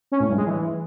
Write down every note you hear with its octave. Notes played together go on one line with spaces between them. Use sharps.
C#4
A2
G2
G#3
E3